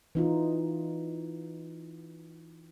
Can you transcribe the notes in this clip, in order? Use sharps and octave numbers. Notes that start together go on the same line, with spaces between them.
E3 D#4 F4